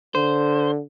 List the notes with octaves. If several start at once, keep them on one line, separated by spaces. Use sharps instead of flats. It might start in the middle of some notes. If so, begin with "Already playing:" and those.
D3 C5